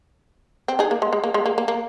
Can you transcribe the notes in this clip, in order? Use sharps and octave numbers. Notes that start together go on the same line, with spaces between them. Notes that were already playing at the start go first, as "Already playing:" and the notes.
C4
D#4 G#4
A#3
G#3
G#3
A#3
G#3
A#3
A#3
A#3